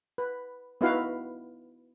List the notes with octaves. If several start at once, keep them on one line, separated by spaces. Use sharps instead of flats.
B4
B3 D#4 E4 F#4 B4 F5